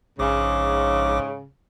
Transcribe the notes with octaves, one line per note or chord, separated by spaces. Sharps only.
A#1 G#2 C#3 D6